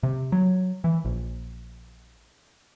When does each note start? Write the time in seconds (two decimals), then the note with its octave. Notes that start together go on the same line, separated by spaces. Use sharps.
0.03 C3
0.32 F#3
0.84 E3
1.05 A#1